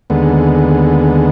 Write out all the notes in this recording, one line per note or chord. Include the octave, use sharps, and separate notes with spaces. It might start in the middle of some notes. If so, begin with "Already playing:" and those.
D#2 D3 G#3 B3